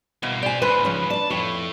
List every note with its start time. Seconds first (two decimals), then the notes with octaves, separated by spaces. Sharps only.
0.23 C2 B2 A#3
0.43 G4 C5 D5 G#5
0.62 G#2 C#3 B4 C5
0.85 F3 C#4
1.10 D4 D5 A5
1.30 F2 A2 C#5